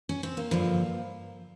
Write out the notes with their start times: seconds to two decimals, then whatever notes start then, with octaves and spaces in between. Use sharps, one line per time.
0.09 C#4
0.23 C4
0.37 A#3
0.51 G2 D3 F3